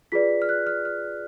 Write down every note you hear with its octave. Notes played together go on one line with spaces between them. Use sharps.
F4 G#4 B4 D5 B6
F6
F#6
F6
F6